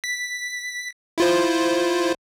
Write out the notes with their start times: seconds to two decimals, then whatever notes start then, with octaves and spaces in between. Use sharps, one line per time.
0.04 B6
1.18 E4 F4 C5